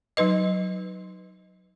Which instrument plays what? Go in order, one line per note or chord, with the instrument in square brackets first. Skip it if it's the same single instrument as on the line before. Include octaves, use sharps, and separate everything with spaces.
[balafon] F#3 D#4 B4 D#5